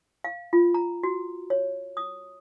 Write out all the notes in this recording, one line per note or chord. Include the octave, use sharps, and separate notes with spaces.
F5
F4
A#5
F#4
C#5
D#6